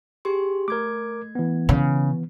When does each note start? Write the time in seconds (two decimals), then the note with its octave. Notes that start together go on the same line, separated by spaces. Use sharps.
0.25 G4 G#4 C6
0.68 A3 A#4 D6 G#6
1.35 E3 B3
1.69 C#3